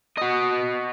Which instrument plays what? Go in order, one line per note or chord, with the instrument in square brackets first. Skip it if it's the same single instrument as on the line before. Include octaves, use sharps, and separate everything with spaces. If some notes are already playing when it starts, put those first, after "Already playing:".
[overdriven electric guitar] F#4 D#5